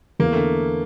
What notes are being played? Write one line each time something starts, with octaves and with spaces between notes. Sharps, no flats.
E2 A#3
D3 A3